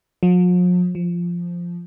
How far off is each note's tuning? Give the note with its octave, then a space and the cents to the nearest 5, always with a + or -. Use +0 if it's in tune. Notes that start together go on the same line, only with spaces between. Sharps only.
F3 +45
F3 -5